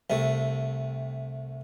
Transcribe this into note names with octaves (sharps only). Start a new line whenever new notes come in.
C2 C3 A3